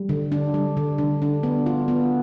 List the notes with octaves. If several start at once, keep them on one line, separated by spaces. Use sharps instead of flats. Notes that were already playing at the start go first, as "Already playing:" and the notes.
Already playing: G3
D3
D4
G3
D3
D3
D4
B3
F4
B3